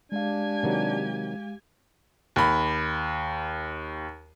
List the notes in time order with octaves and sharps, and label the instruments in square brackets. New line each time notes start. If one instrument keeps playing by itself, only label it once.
[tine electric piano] G#3 F5 [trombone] D4 [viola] G4 G#5
[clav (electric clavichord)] C3 D#3 F#3
[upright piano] D#2 B5